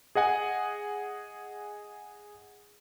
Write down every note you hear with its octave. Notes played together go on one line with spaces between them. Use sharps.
G#4 D#5 F#5 G#5